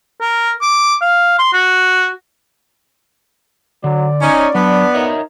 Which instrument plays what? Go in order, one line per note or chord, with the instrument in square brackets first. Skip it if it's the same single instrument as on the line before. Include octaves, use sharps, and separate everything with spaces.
[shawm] A#4
D6
F5
C6
F#4
[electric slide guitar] D3 [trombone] F#3 [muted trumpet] D5
[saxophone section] C#4 [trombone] D#4
[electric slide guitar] F#3 [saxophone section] B3 [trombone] D4
[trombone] D#4 [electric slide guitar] A#4 C#5 E5